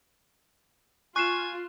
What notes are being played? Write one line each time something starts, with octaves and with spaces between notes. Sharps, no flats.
F4 G#5 C#6 F#6 C7 E7